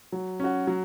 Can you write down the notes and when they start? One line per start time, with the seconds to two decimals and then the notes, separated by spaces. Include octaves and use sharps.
0.12 F#3
0.40 C#4 F#4
0.67 F#3